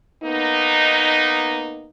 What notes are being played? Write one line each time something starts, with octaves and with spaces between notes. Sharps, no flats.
A#3 B3 D#4